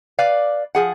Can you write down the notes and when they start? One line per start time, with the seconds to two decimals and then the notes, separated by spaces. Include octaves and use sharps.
0.19 B4 D5 F5
0.75 F3 G#4 F#5